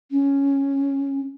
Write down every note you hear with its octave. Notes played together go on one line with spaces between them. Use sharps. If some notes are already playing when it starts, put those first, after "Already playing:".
C#4